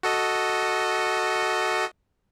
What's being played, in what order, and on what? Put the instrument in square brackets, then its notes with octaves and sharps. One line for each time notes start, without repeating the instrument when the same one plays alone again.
[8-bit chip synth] F#4 A4 D#5